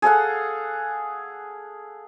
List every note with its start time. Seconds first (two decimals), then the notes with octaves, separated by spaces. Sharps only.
0.02 G#4 A4 F5 F#5